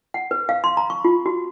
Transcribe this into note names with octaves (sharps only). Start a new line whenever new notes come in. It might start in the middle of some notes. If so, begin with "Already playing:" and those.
F#5
B4
F5
C6
A#5
C#6
F4
F#4